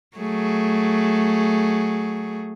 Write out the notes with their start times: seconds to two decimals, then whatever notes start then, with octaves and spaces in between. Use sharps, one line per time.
0.17 F#3 A3 G#4